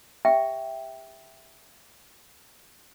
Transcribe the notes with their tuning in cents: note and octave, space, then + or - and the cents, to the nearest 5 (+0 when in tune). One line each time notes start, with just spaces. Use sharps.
G4 +25 E5 +0 G5 +0